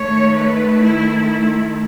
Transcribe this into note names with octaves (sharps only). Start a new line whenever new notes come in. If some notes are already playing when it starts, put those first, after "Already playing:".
Already playing: D#3 A3 C#5
B4
E4
E4